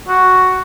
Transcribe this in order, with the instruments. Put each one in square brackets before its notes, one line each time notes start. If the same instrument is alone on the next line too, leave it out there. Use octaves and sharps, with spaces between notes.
[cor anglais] F#4